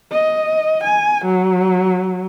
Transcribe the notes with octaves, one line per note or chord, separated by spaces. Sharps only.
D#5
G#5
F#3